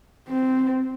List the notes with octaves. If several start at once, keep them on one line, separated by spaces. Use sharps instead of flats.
C4